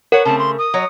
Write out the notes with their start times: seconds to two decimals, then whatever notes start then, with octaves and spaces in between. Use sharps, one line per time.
0.12 A#4 B4 C#5 F#5
0.25 C#3 A3 C4 A5
0.39 C6
0.59 D#6
0.74 F#3 C#5 D#5